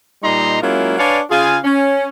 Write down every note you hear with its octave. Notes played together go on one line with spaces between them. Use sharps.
A#2 G3 D#4 D#5 A#5 C6
F#3 G#3 A#3 C#4 E4 F4
D4 B4 C#5 D5 F5 G#5
C#3 F4 G#4 F5 G#5
C#4